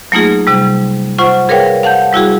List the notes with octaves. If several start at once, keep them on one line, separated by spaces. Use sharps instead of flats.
F#3 A3 A#3 D#4 F4 G#4
C3 G3
F4 C5 F#5 C#6
G#4 A#4 B4 C#5 F5 G5
F5 F#5 A5 G6
G3 E4 F#4 G#4